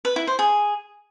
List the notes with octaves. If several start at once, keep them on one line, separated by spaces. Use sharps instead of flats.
B4
E4
C5
G#4